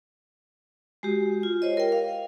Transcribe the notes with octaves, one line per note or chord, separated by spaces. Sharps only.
G#3 F#4 G4
F4
C5 C#5 D#5
A#4 G5
F5